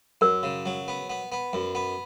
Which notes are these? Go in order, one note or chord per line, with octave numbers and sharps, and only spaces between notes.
F#2 A#4
C#3
F#3
B3
B3
B3
F#2
B3